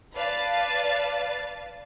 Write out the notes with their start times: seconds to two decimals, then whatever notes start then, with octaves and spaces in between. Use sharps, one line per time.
0.15 B4 D5 F5 A5 A6